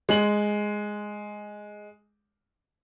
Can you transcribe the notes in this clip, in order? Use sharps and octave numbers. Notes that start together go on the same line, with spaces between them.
G#3 F#7